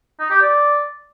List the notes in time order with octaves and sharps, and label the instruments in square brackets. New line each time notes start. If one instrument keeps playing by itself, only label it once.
[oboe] D#4
G4
D5